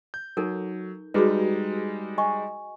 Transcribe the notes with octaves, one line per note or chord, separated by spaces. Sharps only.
G6
F#3 D#4 A4 A#4
G3 G#3 D#4 F#4 G#4 B4
D#5 G#5 C#6